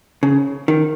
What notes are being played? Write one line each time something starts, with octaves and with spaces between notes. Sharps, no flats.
C#3
D#3